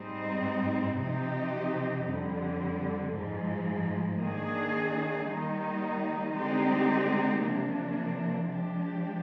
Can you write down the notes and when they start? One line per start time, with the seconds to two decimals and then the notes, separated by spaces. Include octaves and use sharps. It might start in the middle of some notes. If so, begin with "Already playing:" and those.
Already playing: G#2 G3 C4 D#4
0.97 C3 F3 C4 D#4 G4
2.04 F2 D3 G3
3.12 G#2 F3 G#3
4.20 D#3 A#3 D4 G#4
5.27 D#3 G3 A#3 D#4
6.34 D3 G#3 C4 D#4 G4
7.42 C3 F3 A#3 D4
8.49 F3 G#3 D4 G4